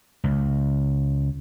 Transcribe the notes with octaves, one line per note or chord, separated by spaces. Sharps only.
C#2